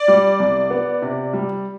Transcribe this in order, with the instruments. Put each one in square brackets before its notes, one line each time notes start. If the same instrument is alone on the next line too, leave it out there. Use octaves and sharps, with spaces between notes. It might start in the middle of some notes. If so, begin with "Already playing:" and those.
Already playing: [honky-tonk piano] D5
[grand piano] G3
C2
B3
C3
G3